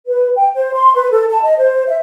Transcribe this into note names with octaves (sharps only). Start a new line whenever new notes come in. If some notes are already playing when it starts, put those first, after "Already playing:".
B4
G5
C5
C6
B4
A4
A5
D#5
C5
E5